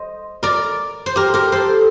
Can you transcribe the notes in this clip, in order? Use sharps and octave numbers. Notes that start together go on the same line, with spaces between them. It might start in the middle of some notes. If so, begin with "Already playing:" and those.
Already playing: C5 D#5
A#4 D5
C5
G4 A#4
G4 A#4
A4 C5